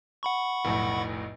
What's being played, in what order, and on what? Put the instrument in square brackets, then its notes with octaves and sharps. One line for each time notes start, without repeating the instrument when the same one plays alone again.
[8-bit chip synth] F#5 B5 C#6
[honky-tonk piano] F1 B1 A2